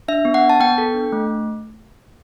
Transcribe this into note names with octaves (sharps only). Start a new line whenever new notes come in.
D4 E5
B3
F#5
B3
A5
B3 G5
A4
D4
A3